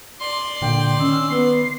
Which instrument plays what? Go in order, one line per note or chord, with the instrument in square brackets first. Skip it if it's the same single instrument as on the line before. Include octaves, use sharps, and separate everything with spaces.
[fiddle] D5 C6
[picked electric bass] A#2 D3 [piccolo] G5
[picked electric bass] D#3 [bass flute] C#4 [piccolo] E6
[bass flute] B3 [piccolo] C7